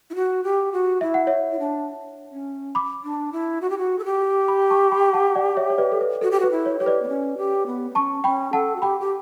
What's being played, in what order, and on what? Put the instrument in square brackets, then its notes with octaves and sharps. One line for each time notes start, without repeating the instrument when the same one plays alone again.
[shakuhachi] E4
F#4
G4
F#4
[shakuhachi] E4 [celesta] E5
[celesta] F#5
C#5 E5
[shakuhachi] E4
D4
C#4
[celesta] B5 D6
[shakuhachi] D4
E4
F#4
G4
F#4
A4
G4
[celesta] B5 D6
A5 C#6
G5 B5
F#5 A5
D5 F#5
C#5 E5
C#5
B4 D5
A4
B4
[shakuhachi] F#4 [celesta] A4
[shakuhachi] G4
[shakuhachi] F#4 [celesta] B4
[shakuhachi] E4
[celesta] C#5
[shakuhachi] G4 [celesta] C#5
[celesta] B4 D5
[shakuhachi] B3
C#4
G4
B3
B3
[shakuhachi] C#4 [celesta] A5 C#6
[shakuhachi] C#4 [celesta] G5 B5
[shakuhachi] A4 [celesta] F#5 A5
[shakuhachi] F#4
[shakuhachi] G4 [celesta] G5 B5
[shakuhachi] G4